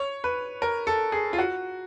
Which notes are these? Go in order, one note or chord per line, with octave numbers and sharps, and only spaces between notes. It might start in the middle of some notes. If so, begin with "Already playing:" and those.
Already playing: C#5
B4
A#4
A4
G#4
F4
F#4